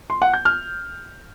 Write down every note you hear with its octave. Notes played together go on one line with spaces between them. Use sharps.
C6
F#5
G6
F6